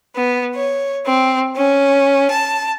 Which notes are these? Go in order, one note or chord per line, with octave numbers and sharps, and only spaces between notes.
B3
C#5
C4
C#4
A5